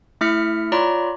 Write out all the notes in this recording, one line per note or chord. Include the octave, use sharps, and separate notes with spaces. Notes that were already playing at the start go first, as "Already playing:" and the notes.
A3 E4 E5 F6 B6 C#7
F4 C#5 D5 A#5 B5